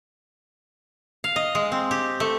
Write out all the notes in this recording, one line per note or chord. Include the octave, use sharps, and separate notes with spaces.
F5
D#5
G#3
C4
G4
A3